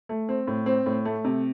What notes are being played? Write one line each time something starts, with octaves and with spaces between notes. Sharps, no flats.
A3
C4
A2
C4
A2
A3
C3